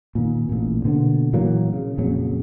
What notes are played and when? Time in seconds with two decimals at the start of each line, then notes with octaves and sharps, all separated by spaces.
0.15 A#2 D#3
0.49 A1 A#2
0.84 B2 D3 A#3 B3
1.33 A#2 E3 F#3 A#3
1.73 C#3
1.98 F2 A#2 C#3 F#3